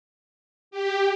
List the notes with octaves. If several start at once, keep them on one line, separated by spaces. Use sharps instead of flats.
G4